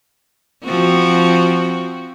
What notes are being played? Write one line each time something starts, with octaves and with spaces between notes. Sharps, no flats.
F3 C4 F#4